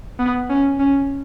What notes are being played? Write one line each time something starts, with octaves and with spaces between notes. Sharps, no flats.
B3
C#4
C#4